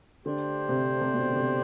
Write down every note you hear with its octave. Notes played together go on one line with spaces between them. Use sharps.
D3 A3 D4 G4 C5
C3
C3
B2
D3
C3